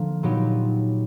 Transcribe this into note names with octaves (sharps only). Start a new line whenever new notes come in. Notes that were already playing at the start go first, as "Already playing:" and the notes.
Already playing: D3 F3 A#3 D4
A#2 F#3 B3 D#4 G4